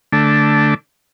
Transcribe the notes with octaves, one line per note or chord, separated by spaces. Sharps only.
D3 A3 D4